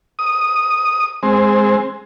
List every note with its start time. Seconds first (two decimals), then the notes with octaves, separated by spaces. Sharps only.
0.19 D#6
1.23 G#3 C4